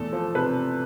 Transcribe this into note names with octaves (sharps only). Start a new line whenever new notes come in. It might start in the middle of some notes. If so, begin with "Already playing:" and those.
Already playing: E2 A3 A4
F3
C3 B4